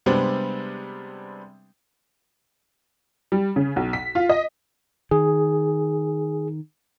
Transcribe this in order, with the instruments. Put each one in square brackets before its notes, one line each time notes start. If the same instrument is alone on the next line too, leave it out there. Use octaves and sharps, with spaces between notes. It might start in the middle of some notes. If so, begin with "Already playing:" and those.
[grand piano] C3 G3 G#3 B3 C4 D4
[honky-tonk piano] G3
C#3
B1
B6
F4
D#5
[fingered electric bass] D#3 [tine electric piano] G#4